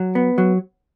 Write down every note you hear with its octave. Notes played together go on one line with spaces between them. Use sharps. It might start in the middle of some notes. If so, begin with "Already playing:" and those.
Already playing: F#3
B3
F#3